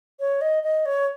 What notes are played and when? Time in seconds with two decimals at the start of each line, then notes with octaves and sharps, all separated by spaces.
0.20 C#5
0.41 D#5
0.63 D#5
0.86 C#5